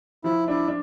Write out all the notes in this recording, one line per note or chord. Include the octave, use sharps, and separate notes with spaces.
F3 E4
D4 E4
D4